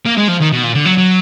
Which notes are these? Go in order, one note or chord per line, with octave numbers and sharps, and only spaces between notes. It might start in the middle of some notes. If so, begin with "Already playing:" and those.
A#3
G#3
F3
D#3
B2
A#2
D3
F#3
F#3